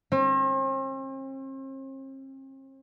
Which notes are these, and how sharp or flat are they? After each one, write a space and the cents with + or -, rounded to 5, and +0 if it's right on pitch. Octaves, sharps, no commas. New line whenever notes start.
C4 +45